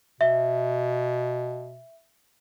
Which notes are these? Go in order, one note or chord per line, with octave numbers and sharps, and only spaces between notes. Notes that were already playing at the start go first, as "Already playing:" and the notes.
B2 E5